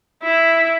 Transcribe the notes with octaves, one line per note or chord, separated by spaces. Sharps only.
E4